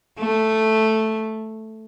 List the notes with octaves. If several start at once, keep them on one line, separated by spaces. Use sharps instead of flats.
A3